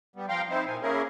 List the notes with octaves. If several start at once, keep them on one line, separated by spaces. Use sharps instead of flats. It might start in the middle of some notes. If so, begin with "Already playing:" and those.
G3 B3
F3 F5 G5 A#5 C6
C4 D#4 E4 C5
A#2 G#5
A#3 C#4 E4 G#4 A#4